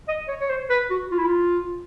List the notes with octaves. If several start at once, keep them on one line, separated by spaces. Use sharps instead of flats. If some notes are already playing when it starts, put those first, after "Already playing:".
D#5
C#5
C#5
C5
B4
F#4
F4
E4
F4